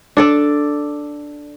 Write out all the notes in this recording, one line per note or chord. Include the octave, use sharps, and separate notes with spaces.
D4 A4 D5